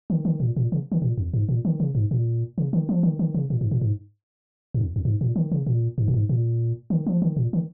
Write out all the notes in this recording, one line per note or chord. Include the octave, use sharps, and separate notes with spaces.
D#3
D#3
A#2
A#2
C#3
D#3
A#2
F2
G#2
A#2
D#3
C#3
G#2
A#2
C#3
D#3
F3
D#3
D#3
C#3
A#2
G#2
A#2
G#2
G#2
F2
F2
G#2
A#2
D#3
C#3
A#2
G#2
A#2
G#2
A#2
D#3
F3
D#3
A#2
D#3